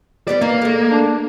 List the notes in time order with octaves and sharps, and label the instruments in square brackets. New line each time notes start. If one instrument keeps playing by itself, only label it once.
[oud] G3 B3 G4 [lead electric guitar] D5
[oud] E3 D#4 [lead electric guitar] A#3
[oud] G#3 A3
[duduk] D4